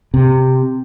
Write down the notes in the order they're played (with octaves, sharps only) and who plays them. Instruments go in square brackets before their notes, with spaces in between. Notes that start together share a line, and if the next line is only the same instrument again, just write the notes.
[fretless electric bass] C3